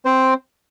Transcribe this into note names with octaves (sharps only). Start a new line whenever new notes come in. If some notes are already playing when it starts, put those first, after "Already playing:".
C4 C5